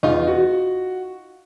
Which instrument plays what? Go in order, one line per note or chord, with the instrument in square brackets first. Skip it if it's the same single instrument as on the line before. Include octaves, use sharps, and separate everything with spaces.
[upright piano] E2 [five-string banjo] D#4 F4
[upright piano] F#4